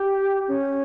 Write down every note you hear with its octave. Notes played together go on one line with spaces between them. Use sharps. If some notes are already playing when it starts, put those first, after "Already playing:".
Already playing: G4
C#4